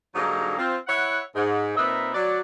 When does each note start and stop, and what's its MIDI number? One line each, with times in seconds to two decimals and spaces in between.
0.15 0.55 44
0.15 0.55 50
0.15 0.55 54
0.15 0.55 55
0.15 0.55 58
0.15 0.55 63
0.58 0.76 60
0.58 0.76 65
0.87 1.20 64
0.87 1.20 73
0.87 1.20 76
0.87 1.20 78
1.35 1.74 44
1.77 2.14 46
1.77 2.14 60
1.77 2.14 63
1.77 2.14 70
1.77 2.14 71
1.77 2.14 76
2.15 2.41 54
2.15 2.41 74